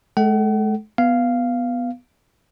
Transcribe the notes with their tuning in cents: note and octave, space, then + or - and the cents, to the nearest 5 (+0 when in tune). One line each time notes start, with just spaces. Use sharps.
G#3 +40 A4 +0 F#5 +40
B3 +0 F5 -5